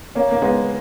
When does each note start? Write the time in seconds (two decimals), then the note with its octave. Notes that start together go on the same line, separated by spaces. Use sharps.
0.15 A#3 C#4
0.31 A#3
0.42 G#3 B3